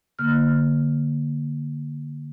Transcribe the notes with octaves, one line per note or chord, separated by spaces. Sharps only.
D3 A#3 F6